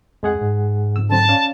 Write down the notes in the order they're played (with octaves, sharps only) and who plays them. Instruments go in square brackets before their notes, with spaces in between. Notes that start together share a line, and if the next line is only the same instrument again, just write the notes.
[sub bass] F2 [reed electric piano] G#3 G#4 F#5
[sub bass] G#2
[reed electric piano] F2 E6
[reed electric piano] D3 F#3 C4 [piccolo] A5
[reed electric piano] C#4 D5 F5